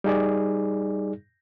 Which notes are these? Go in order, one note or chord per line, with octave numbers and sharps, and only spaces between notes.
G3 D#4 G#4 D5